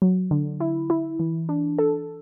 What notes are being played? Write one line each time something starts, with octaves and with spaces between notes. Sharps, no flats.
F#3
D3
E4
E4
E3
D4
A4